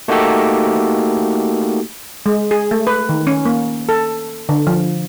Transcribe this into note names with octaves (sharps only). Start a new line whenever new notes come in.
A3 A#3 D#4 F#4 G4 A4
G#3
G#4
A3
B4
D#3
C#4
A#3
A4
D3
F3